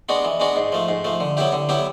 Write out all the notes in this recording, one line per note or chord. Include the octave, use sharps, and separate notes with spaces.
G#3 B3 D4 F#4
E3
G#3 B3 D4 F#4
G#2
F3 A3
G#2
F3 A3
D3
F#3 B3 E4 G4
D3
F#3 B3 E4 G4